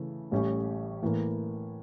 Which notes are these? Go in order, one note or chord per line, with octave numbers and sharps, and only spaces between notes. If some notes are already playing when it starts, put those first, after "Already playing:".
Already playing: C#3 E3 A3
A1 A2 G3 C#4 G4
A2 E3 A#3